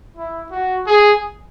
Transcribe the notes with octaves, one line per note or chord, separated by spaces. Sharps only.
E4
F#4
G#4